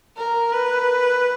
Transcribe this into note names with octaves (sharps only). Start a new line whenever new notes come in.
A#4
B4